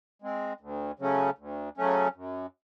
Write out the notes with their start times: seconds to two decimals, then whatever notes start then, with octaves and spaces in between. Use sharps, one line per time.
0.22 G#3 C4
0.61 D2
0.99 C#3 F#3 A3 C#4
1.38 D2
1.78 C#3 F#3 A3 C#4
2.15 F#2